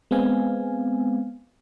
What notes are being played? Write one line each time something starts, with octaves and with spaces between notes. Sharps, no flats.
G#3 B3 C4 F5 G#5